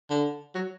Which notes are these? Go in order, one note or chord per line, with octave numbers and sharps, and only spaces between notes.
D3
F#3